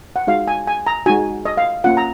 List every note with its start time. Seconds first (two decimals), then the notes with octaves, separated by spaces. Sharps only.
0.16 F#5
0.27 G#3 D#4 F#4 F5
0.48 G#5
0.67 G#5
0.87 A#5
1.06 G#3 D#4 F#4 G#5
1.45 D#5
1.57 F5
1.84 A#3 C#4 F4 F#5
1.97 A#5